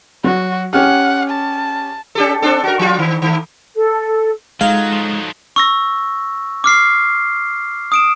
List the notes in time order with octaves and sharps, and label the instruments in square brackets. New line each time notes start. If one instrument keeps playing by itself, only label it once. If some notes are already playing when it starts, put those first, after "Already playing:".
[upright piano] F#3 [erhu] F#4
[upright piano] C#4 G4 F6 [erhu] F#5
[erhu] A5
[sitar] C#4 G4 A4
C4 D4 A4
F#4 A#4
F3 F4
D#3
D#3 A3
[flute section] A4
[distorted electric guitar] F#3 [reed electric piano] G#3 [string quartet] D#4 F4 A4 [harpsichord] F5
[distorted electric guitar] F3 F#3
[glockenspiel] C#6 E6 A#6
D6 F6 C7
D#6 D7 E7